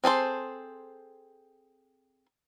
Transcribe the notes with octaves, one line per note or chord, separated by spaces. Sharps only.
C4 G#4 A4 C5